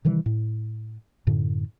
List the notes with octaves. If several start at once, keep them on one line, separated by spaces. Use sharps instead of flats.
C3 D#3 E3 G3
A2
F#2 A2 D3